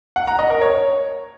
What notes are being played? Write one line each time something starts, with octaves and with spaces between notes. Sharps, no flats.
F#5
A#5
D#5
A#4
C#5